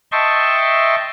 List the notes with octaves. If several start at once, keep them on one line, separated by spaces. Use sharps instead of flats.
D#5 E5 G5 A5 C6 C#6